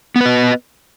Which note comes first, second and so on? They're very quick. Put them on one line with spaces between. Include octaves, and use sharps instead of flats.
B3 B4 D#5